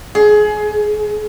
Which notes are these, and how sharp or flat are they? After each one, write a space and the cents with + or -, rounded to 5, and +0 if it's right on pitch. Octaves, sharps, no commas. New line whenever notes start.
G#4 +25